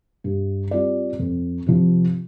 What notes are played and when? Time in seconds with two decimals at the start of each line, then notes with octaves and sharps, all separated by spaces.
0.24 G2
0.71 G3 C4 F4 D5
1.19 F2
1.67 C3 F3